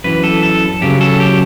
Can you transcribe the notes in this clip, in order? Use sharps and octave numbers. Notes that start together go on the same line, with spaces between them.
F#2 E3 B4
A4
A4
F#2 C#3 F#3 G4
A4
G4